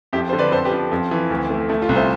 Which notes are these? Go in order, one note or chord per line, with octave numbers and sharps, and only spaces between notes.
F2 E4 G4
D3 C5
B4 D5
F2 A4 C5
G4 B4
F3
F2
E3
D2
A3
A3 E4
F4
C2
C5 E5